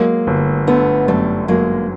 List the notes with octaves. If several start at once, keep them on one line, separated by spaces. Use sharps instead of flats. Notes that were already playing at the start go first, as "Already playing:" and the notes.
Already playing: F#3 G#3 A#3
G1
D3 A3 B3
F#2 G3 A3
F#3 G#3 A#3